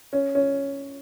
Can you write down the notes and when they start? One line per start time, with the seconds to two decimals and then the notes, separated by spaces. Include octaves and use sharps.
0.13 C#4
0.35 C#4